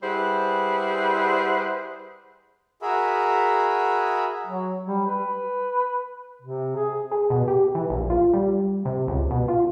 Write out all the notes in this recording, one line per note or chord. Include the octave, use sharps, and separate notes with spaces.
G3 E4 G#4 B4 C5 F#5
F#4 G#4 A#4 E5 B5
F#3
G3
B4
C3
G#4
G#4
B2
G4
E3
A#1
F4
G3
C3
C#2
B2
F4